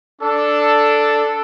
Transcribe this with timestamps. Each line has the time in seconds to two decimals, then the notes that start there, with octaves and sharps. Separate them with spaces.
0.22 D4 A4